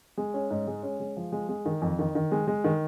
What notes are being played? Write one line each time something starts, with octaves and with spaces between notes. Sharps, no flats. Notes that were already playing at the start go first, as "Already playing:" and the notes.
G#3
C#4
G#2
G#3
C#4
G#3
F3
G#3
G#3
D#3
F2
D#3
D#3
G#3
G#3
D#3